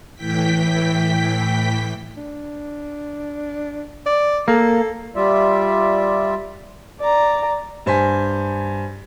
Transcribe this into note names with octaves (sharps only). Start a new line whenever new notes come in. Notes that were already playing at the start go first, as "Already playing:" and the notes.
A2 E3 G5 B6
D4
D5
A#3 A4
G3 F4 D5 E5
D5 A#5
G2 C5 G#5 B6